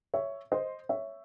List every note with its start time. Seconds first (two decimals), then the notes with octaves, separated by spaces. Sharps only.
0.14 C#5 E5
0.52 C5 D#5
0.89 C#5 E5